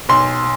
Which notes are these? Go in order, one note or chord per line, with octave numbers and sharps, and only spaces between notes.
B1 C6